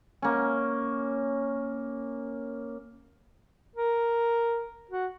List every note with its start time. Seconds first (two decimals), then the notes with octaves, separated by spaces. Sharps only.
0.22 A#3 C#4
3.75 A#4
4.91 F#4